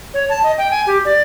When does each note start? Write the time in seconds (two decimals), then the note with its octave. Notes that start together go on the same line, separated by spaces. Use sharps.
0.14 C#5
0.29 A5
0.43 D#5
0.58 G5
0.71 G#5
0.87 G4
1.05 D5